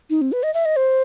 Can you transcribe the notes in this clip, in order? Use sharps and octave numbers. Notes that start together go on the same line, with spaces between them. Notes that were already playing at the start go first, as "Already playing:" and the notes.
D#4
C4
B4
D#5
E5
D#5
C5